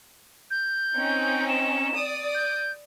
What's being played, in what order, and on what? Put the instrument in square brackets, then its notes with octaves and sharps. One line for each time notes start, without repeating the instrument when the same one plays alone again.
[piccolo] G6
[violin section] C4 C#4 D#4
[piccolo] E7
[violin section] D5 D#6
[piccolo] G6